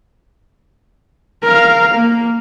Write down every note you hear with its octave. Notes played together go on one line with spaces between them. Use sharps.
A#4 F5
A#3